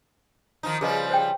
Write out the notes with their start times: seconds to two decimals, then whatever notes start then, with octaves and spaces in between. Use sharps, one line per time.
0.63 D#3 F3 D#4
0.81 C#3 F3 G3 G#4 B4 D#5
1.10 C5 C#5 G5